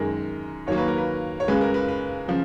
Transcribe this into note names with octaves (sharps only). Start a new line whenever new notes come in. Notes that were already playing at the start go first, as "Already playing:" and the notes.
Already playing: F#2 D#3 G#3 A#4
D#2 D#3 F#3 A#3 C#5
B4
A#4
B4
C#5
C#2 C#3 G#3 B4
A#4
B4
B4
C#3 F3